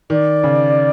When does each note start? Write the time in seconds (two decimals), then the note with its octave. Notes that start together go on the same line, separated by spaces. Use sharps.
0.10 D#3 D5
0.44 C#3